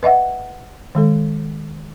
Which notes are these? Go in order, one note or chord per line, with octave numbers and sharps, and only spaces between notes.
B4 D#5 E5 F#5
D#3 G#3 A4